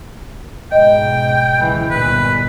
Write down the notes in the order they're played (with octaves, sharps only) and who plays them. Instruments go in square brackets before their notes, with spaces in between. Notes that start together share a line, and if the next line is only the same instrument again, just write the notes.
[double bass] G#2 B2 [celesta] D#5 [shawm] G5
[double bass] C#2 E3
[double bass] G1 A#2 [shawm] B4